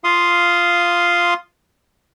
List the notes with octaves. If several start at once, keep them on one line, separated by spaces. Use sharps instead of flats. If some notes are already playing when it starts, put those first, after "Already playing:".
F4 F5 C6 D#6